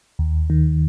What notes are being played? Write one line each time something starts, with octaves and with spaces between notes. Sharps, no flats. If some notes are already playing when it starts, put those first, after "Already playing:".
D#2
D#3